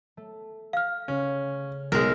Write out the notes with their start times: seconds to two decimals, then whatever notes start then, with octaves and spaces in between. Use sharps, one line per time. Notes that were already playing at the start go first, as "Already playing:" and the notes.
0.17 A3
0.73 F5 F6
1.08 C#3 C#4
1.92 B1 G#3 A#4